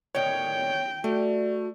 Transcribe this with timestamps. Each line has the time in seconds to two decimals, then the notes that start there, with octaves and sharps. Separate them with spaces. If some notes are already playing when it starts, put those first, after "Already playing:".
0.15 A2 D3 D#3 C#5 G5
1.04 G3 A3 F#4